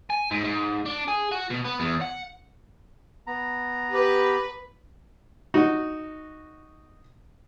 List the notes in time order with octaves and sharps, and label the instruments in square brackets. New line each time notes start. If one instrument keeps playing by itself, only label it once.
[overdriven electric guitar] G#5
G#2
G#2
D4
G#4
F#4
B2
B3
E2
F#5
[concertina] B3 A#5
[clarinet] G4 [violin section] B4
[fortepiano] D#4 F#4